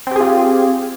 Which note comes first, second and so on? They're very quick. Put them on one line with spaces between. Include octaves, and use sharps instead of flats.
C4 G4 G#4 F4